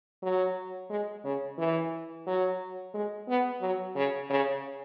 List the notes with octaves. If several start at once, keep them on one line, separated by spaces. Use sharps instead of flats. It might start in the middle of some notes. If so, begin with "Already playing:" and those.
F#3
G#3
C#3
E3
F#3
G#3
B3
F#3
C#3
C#3